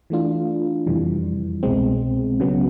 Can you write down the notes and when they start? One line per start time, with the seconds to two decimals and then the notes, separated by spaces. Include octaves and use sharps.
0.10 E3 A3 D4 F4
0.87 F2 C3 E3 G3
1.63 C2 B2 G#3 C4
2.40 C#3 F#3 B3